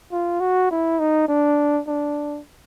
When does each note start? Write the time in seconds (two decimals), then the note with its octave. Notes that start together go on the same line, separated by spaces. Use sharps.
0.12 F4
0.40 F#4
0.71 E4
0.99 D#4
1.28 D4
1.87 D4